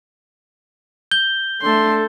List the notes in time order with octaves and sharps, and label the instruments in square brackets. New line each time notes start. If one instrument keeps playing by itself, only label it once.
[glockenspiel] G6 G7
[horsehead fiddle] A3 D4 [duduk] A4 [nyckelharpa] C6